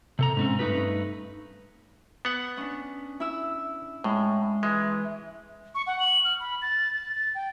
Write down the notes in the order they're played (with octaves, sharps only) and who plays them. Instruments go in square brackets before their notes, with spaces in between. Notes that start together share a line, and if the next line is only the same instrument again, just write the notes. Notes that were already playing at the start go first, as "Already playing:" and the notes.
[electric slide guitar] C3 A4 A#5
G#2 C4 C#4
G2 A3 D#4 G4 B4
[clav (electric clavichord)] B3 F#5
[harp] C#4 D4
E4 E6
[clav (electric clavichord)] A2 [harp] G#3
[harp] E3 [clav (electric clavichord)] G#3
[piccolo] C#6
F#5
F#7
F6
B5
A6
A6
A6
G5